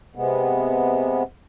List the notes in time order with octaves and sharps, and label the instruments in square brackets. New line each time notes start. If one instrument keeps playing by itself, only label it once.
[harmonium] C3 G#3 B3